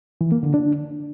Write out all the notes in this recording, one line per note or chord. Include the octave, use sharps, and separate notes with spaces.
E3
A#3
D3
D4